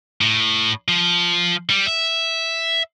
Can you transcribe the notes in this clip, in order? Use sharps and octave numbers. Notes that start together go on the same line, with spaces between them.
A2
F3
G3
E5